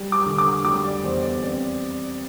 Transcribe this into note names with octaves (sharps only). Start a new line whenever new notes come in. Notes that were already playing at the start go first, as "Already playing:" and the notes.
Already playing: G3
D6
D3
D6
G3 D6
D5
E2 C5
D5
C4 D5